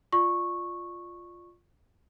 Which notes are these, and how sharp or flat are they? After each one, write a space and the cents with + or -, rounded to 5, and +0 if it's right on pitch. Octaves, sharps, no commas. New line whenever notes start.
F4 +0 D5 +20 C#6 -10